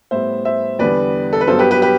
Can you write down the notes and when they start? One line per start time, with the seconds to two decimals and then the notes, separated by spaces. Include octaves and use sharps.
0.11 A2 G3 B3 C5 E5
0.45 C5 E5
0.79 E2 D3 G3 B3 B4 D5
1.33 A4
1.41 B4
1.47 G2 F#3 B3 A4 C5
1.59 G4 B4
1.71 G4 B4
1.82 G4 B4